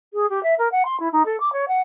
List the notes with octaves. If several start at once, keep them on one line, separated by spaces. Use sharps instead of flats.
G#4
G4
E5
A#4
F#5
C6
E4
D#4
A4
D6
C#5
F#5